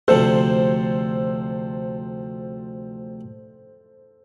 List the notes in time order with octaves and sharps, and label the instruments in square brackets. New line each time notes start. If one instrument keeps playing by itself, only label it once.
[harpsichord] D2 C3 F3 [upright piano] A4 C5